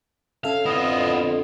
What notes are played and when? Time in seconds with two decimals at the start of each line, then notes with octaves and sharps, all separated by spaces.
0.44 C#4 A4 E5 F5
0.66 F2 D3 B3 E4 F4 D#5